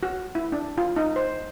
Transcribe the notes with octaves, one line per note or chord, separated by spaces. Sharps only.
F#4
E4
D4
F4
D#4
C5